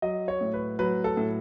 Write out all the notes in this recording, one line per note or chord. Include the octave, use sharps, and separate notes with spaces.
F#3 D#5
C#5
A2
B4
F#3 B4
A4
A2